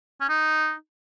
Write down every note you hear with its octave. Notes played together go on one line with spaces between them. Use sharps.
C#4
D#4